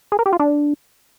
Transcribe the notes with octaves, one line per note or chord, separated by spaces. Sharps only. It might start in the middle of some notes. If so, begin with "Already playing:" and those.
G#4
A#4
G4
F4
D4